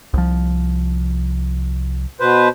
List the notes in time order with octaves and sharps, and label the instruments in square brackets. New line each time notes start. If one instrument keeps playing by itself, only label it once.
[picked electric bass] C2 F3
[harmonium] B2 B4 C5